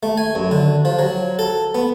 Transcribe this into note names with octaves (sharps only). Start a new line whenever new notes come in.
A3
G#5
F#2
D3
F3
F#3
A4
B3